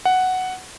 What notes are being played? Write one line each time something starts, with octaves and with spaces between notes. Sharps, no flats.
F#5